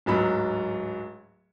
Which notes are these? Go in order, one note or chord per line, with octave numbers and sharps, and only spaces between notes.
D1 G#2 F#3 B5